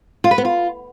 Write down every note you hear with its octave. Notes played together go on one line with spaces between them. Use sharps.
F4
B4
B3
F4